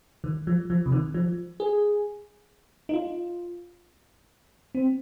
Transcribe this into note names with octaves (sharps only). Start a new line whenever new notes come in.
D#3
F3
F3
C3
D#3
F3
G#4
D#4
F4
C4